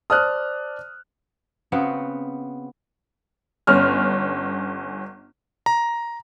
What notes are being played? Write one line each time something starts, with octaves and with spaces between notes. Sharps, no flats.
C5 D5 A5 D#6 F6 F#6
C#3 B3 C4 F#4
G1 C#4 F6
A#5